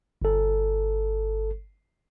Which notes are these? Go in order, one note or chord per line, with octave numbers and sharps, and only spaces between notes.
G1 A4